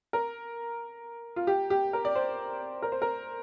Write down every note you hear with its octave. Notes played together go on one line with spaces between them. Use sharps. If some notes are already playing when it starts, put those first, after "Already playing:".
A#4
F4
G4
G4
A#4
D5
C5
A#4
C5
A#4